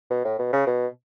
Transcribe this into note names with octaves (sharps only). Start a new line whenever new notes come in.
B2
A2
B2
C#3
B2